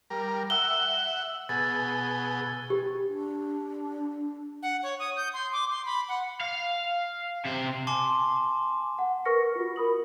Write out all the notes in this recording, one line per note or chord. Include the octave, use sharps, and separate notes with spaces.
G3 A#4
E5 F#5 E6 G7
B2 G#4 A6
G4
D4
F#5
C#5
D#6
G6
C6
D6
C6
B5
F#5
F5
C3 C5
G#5 A5 C6 D6
F#5
A#4 B4 C#6 F6 A#6 C#7
F4 F#4
A#4 B5 D#6 F#7